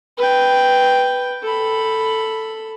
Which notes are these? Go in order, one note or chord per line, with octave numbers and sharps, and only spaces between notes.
B4 G5
A4 B5